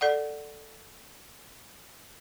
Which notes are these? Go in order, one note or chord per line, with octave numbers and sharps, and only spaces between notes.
A4 D5 F#5